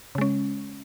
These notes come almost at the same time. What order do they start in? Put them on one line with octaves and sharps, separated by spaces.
C#3 G#3 C#4